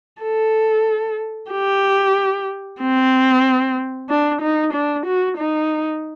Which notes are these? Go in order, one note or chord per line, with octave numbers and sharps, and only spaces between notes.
A4
G4
C4
D4
D#4
D4
F#4
D#4